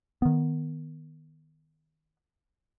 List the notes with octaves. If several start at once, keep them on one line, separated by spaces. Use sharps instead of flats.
D#3 B3